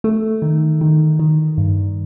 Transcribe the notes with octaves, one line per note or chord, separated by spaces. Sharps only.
A3
D#3
D#3
D#3
G2